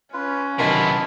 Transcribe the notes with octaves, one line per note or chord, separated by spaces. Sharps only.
C#4 F4 B4
B1 C3 D#3 B3 E4 F4 A#4 A5